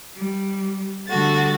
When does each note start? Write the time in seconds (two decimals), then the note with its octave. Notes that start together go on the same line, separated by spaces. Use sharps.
0.15 G3
1.08 D3 G3 A3 F#4 A6